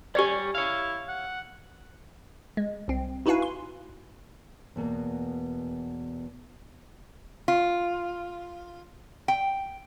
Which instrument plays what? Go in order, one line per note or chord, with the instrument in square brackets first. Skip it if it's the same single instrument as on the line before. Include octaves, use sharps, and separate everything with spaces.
[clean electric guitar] G3 C#5 G#5 [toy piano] G4 D5
[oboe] E4 [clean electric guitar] C#5 F5
[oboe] F#5
[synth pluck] G#3
C2 C4
D#4 E4 F#4 B4 F5 G#5
C6
[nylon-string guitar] E2 B2 A#3
[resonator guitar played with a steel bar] F4
G5